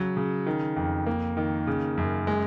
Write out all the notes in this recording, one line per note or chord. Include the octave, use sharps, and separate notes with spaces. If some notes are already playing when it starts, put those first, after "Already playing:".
Already playing: C#3 F#3
C#3
D#3
F2
A#3
D#3
C#3
F#2
G#3